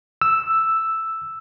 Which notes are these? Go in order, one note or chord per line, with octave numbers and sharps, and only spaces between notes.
E6